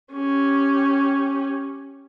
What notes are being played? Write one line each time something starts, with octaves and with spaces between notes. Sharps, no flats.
C#4 G4